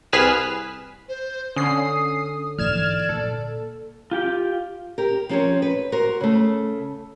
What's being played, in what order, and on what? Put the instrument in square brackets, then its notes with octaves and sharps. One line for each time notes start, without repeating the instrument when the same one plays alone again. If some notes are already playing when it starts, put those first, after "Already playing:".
[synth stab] C2 G#4 B4 F6 B6 E7
[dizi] C5
[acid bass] D3 [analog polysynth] C#4 C7 [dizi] D#6
[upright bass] G#2 E3 [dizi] D5 [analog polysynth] F6 G#6 E7
[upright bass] A#2 [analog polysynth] A4
[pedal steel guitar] F4 G4 G5
[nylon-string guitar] G4 A#4
F3 C4 C#4 A4 A#4 C#5
B4
F#4 A#4 C5
C#3 A3